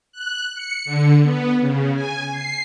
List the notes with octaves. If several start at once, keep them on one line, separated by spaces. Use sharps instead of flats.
F#6
C#7
D3
B3
C#3
G#5
C7